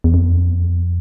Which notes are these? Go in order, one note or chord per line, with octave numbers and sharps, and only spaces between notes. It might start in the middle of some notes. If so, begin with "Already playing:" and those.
E2
F2